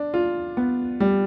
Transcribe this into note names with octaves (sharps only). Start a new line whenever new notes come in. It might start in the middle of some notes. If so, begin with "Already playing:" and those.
Already playing: D4
F4
B3
G3